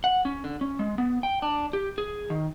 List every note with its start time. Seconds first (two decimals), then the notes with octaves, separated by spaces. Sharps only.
0.04 F#5
0.25 C#4
0.44 D3
0.61 C#4
0.79 G#3
0.98 B3
1.23 G5
1.42 D4
1.73 G4
1.98 G#4
2.30 D#3